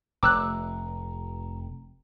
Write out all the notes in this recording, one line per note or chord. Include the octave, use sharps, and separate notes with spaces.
F1 G5 A#5 D6 E6 F#6